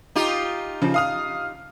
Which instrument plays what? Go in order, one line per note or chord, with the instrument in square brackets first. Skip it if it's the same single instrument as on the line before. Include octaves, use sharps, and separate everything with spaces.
[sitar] D#4 F4 G4
[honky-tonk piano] C#3 F3
F5 D#6 F6